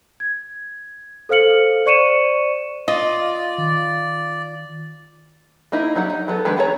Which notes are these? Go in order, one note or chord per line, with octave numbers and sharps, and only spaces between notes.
G#6
A4 C5 F5 F6 C#7 F#7
C5 D5 C#6 C#7 D#7 E7
F4 D5 D#5
D#3
A#3 D#4 E4
F#3 G3 D#4 F#5
D#4
F#3 B3 A4
D#3 G#3 D4 B4
B3 G#4 A4 C#5 A#5